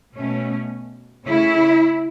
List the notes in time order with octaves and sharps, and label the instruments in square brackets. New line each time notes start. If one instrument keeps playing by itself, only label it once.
[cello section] B2 A3 C#4
C#3 A3 C#4 E4